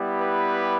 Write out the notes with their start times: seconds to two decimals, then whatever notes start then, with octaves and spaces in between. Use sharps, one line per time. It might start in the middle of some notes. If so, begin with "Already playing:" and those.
Already playing: G3 B3 E4 G4
0.21 B4